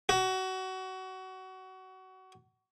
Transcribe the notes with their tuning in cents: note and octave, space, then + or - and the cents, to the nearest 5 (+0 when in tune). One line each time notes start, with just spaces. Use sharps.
F#4 +25